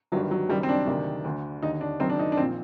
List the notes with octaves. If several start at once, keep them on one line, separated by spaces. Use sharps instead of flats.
G1 G2 D#3 F#3
F#3
F#1 F#2 D#3 G3
C4
D4
D2 C3 D#3
D2 D3
D#2 D3 D#4
D4
F#1 F#2 D#3 C4
D4
D#4
D4
A#1 A#2 C4